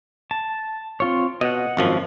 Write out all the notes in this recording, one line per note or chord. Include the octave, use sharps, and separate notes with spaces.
A5
C4 F4 C#5
B2 D#5 F#5
G#1 F#2 F3